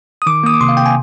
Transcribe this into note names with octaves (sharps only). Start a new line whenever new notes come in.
D#6
D#3 D6
A#3 D#6
D6
C3 C6
F5
C3 G5
G#5